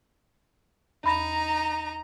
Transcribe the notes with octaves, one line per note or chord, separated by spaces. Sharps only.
E2 D#4 A#5 B5 A#6